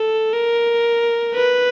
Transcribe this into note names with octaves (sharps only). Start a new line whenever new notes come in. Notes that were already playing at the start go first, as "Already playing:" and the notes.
Already playing: A4
A#4
B4